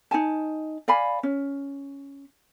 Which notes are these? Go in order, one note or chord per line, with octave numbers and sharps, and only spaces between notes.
D#4 G4 G#5 A5
D5 F5 G#5 B5
C#4